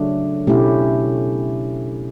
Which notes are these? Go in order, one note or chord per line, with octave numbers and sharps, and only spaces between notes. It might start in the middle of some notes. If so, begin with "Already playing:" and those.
Already playing: C#3 F#3 A3 D4
B2 A3 C#4 E4 G4